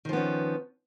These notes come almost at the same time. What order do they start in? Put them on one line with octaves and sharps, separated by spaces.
D#3 F3 B3 C#4